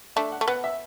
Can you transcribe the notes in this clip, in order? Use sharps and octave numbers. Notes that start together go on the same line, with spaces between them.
A3 D4 E5
F#5
A3
B3 F#5
E5